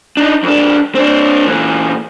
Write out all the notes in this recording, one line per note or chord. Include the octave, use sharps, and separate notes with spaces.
D4 D#4
F2 D4
C4 D4
A#2 E3